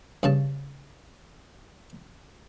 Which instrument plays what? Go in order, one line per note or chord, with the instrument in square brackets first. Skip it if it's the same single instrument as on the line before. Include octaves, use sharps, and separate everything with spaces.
[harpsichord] G2 C#3 A5